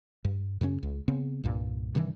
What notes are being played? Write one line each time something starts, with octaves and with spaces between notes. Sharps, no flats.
G2
F#2 C#3 A3 C#4
C#2
C#3 B3 C4
C2 G2 A#2
G2 C3 D#3 E3